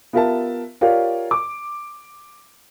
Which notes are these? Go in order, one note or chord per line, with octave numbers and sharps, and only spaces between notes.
B3 F4 G4 A#4 E5 A5
F4 G4 A#4 C#5 D5 F5
D6